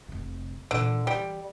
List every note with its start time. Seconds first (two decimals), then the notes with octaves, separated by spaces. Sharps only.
0.08 F1 C3
0.71 A#2 D3 E3
1.07 E3 G3